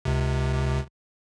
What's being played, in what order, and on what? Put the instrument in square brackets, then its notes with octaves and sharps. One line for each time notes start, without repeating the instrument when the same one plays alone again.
[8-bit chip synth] C#2 C3